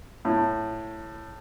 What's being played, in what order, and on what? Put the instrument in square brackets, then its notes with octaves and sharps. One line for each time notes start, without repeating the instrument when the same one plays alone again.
[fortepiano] A2